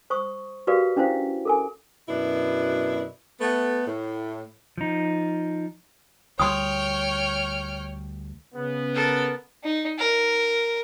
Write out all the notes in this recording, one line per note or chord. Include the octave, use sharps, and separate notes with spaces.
C5 C#6 D#6
F#4 G4 A#4 B4 D5 F5
C#4 D4 E4 C5 F5
A4 A#4 G#5
F#2 B2 D4 E4
A3 B3
A2
F3 D#4
D2 G3 C#5 G5 C6 D#6 F6
C#3 B3
A4 A#4
D#4
A#4